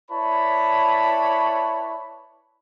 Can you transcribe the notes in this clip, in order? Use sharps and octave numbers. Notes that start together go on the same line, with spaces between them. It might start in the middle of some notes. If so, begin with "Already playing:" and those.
E4 B4 C#5 D5 A5 B5